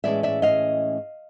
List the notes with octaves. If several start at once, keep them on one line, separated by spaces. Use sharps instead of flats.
A2 E3 G#3 C#4 D5 E5
D5 E5
D#5 F5